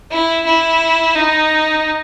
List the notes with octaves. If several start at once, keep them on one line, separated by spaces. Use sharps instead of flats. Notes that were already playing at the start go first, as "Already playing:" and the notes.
E4
E4
D#4